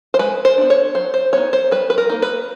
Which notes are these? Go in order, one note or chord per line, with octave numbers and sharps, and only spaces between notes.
C5
G#3 B4
C5
B3 D4
C#5
F#3 C5
C5
B3 D#4 C#5
C5
G3 B4
B4
A#4
A#3 D#4
B4